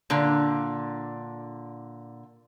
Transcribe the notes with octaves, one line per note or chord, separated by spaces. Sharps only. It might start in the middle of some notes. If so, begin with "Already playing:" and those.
A#2 D3